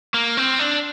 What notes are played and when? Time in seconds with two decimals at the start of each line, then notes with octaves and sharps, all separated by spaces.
0.14 A#3
0.37 C4
0.59 D4